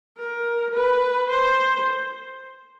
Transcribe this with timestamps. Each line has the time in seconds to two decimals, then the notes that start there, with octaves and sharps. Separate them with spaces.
0.18 A#4
0.74 B4
1.30 C5